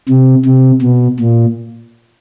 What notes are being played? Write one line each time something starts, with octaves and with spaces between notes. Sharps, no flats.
C3
C3
B2
A#2